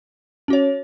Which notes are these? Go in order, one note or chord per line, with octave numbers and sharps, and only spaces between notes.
C#4 F#4 C#5